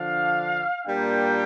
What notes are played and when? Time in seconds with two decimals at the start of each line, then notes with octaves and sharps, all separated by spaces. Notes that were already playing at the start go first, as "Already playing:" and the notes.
Already playing: D3 F3 D4 F5
0.85 A#2 G3 A#3 D4 G5